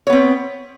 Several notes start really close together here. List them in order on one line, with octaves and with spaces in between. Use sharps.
C#5 B3 C4